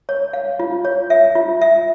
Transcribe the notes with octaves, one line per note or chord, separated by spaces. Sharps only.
C#5
F5
F4
C#5
E5
F4
E5